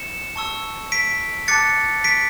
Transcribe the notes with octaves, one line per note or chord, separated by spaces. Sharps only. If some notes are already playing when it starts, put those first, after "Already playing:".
Already playing: C#7 E7
A5 C#6 E6
B6 D7
A5 D6 F#6 A6 C#7
B6 D7